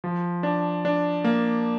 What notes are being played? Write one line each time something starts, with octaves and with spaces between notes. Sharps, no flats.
F3
D4
D4
A#3